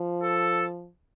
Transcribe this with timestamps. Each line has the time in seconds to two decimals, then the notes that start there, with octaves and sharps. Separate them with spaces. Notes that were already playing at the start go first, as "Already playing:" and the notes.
Already playing: F3
0.23 A4